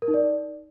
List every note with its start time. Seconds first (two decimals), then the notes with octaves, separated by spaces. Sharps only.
0.02 A#4
0.08 D#4
0.14 D5